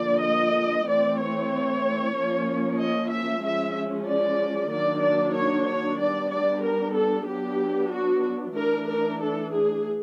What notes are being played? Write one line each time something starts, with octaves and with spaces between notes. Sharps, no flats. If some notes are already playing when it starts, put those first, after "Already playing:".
Already playing: D3 F3 A#3 D5
D#5
E3 A3 C4 D5
C#5
F3 A#3 C#4
D#5
E5
F3 G#3 C#4 E5
D5
D#3 F#3 A#3 D4 D5
D5
C#5
C#5
G3 B3 D4 D5
D5
A#4
A4
F#3 B3 D4 G4
F#4
E3 A3 D4 A#4
A#4
A4
G#4